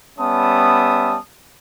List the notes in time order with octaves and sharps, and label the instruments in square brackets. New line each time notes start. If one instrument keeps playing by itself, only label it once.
[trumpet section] G3 B3 C#4 E5 A5 D#6